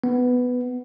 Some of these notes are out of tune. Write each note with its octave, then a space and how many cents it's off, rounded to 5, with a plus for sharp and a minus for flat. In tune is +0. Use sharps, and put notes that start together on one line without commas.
B3 +5